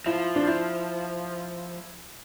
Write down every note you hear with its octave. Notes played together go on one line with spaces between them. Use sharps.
F3 E4
D4
E4